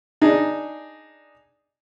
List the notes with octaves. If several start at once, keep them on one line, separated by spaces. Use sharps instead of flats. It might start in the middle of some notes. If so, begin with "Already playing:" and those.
D4 D#4 G#4